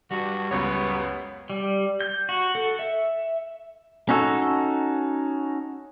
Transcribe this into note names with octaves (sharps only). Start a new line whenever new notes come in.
G2 G3 F#4
C#2 F#2 B3 C#5
G3
G6
F#4
A4
E5
C#4 D#4 F#4 A4